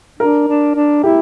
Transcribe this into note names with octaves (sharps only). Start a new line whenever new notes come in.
D4 A#4
D4
D4
E4 G4